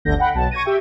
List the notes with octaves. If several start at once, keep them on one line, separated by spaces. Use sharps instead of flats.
G1 D2 D3 G6 A#6
F#5 G5 B5
B1 A5
C#6 G#6 A#6 D#7
G4 E5 G5